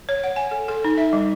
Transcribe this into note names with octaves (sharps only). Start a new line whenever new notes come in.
C#5
F#5
G#5
A4
A4
D#4
E5
G3